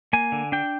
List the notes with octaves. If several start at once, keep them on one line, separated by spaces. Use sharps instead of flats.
A#3 G#5
D3
D4 G5